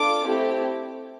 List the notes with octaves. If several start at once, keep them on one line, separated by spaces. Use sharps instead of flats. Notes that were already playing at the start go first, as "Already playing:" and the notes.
Already playing: D4 F4 A4 D6
A3 C4 E4 G4